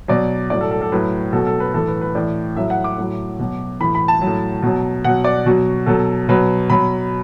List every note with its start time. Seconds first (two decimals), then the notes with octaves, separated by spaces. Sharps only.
0.08 B2 F#3 D5
0.50 A2 F#3 D5
0.61 A4
0.71 A4
0.81 A4
0.92 A2 F#3 B4
1.33 B2 F#3 A4
1.47 A4
1.60 B4
1.74 A2 E3 A4
1.88 B4
2.01 B4
2.15 A2 E3 D5
2.56 A2 F#3 E5
2.70 F#5
2.84 D6
2.98 A2 F#3
3.39 B2 F#3
3.80 A2 E3 B5
3.95 B5
4.08 A5
4.22 F#3
4.27 A2
4.63 B2 F#3
5.04 B2 F#3 F#5
5.24 D5
5.46 B2 F#3 F#4
5.86 B2 F#3 A4
6.29 B2 F#3 B4
6.70 B2 F#3 B5